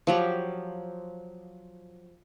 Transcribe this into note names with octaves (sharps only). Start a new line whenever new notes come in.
F3 F#3 G4